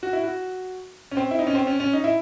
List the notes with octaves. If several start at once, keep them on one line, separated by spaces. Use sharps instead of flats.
F#4
E4
F#4
C#4
C4
E4
D#4
C#4
C4
C#4
C#4
D#4
E4